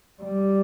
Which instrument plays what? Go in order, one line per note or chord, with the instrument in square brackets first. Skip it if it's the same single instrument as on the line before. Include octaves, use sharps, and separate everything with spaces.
[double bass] G3